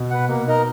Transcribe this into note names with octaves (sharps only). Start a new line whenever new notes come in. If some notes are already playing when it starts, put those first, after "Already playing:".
Already playing: B2
B4 F#5
B2 A#3
D#4 A#4 D#5